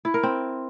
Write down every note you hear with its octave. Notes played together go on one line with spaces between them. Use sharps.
E4
A#4
C4